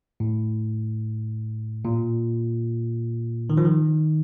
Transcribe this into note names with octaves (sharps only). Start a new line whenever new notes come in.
A2
A#2
D#3
F3
D#3